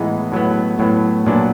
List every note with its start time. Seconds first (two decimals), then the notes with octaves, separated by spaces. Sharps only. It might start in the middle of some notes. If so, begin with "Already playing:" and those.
Already playing: A2 E3 G#3 B3 D#4
0.32 A2 F#3 B3
0.79 A2 F#3 B3
1.26 A#2 F#3 B3 D4